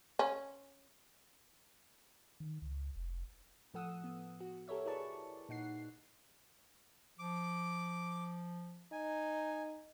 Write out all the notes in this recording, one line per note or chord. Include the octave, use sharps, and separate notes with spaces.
C#4
D#3
C#2
F1
A2 F3 A4 F#5 D#6 E6
B3
F#4
G4 A4 A#4 C#5 E5
E4 G#4 B4 D5 A5 C#6
A#2 D#4 F#5 C7
F3 D6
D#4 G#5